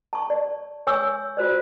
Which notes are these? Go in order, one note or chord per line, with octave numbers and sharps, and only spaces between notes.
A5 C#6
D5
C#5 G#5 C#6 E6
F4 F#4 C5 D5